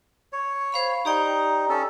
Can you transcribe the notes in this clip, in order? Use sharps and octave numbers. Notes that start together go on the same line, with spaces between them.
C#5
C5 F5 B5
D#4 G4 D5 G5
C#4 A4